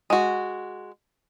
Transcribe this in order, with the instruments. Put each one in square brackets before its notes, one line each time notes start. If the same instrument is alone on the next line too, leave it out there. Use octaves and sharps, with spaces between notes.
[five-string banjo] G#3 F#4